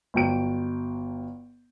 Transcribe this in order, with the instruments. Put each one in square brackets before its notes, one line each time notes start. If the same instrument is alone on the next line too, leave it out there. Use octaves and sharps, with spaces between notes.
[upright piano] G1 F#3 G5 D7